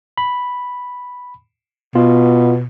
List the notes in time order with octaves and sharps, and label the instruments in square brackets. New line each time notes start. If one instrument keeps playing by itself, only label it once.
[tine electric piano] B5
[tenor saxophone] B2 [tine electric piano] B3 F4